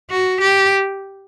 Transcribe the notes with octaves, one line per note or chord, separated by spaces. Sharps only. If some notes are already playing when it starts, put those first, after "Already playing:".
F#4
G4